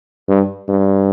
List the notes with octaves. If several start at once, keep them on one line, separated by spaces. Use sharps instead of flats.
G2
G2